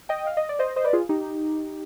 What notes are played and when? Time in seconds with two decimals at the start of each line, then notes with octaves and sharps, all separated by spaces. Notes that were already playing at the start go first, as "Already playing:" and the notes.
0.09 D#5 G5
0.27 F5
0.37 D#5
0.49 D5
0.59 C5 D#5
0.76 C5 D#5
0.84 B4 D5
0.93 F4 G#4
1.09 D#4 G4